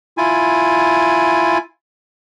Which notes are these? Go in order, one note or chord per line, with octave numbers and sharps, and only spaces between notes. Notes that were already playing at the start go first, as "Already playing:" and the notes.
E4 F4 G#5